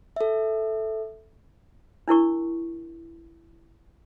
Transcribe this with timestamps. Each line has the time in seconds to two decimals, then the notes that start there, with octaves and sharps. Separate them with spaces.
0.16 A4 E5
2.08 D4 E4 A#4 C#6